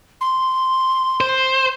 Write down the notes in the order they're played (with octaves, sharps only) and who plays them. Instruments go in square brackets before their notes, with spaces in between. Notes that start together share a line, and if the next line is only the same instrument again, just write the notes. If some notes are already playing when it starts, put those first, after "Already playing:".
[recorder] C6
[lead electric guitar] C5